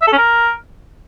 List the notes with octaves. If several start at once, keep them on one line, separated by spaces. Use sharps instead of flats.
E5
A4
C#4
A#4